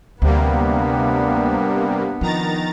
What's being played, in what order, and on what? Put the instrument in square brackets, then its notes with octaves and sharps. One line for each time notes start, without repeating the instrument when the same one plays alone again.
[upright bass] D2 [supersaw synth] C3 G3 A#3 [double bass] B3 D4
[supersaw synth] D#3 A#5 A6 [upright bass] F3 C4